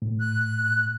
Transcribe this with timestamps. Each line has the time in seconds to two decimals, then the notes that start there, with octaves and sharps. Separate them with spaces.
0.02 A2
0.20 F#6